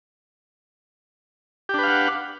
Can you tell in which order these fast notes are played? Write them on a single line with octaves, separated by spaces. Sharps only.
G4 D4 B4 F5 F#5